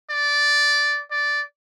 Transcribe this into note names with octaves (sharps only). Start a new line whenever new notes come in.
D5
D5